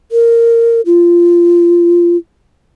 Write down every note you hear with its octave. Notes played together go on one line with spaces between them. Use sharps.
A#4
F4